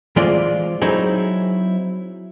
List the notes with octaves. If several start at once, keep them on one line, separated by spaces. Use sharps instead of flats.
E3 G#3 C4 F4 D5
F#3 C4 D#4 E4 G#4